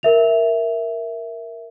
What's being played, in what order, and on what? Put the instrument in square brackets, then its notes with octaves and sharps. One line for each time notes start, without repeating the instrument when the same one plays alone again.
[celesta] A#4 E5 F7